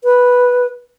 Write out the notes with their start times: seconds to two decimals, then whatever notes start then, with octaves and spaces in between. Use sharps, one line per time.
0.04 B4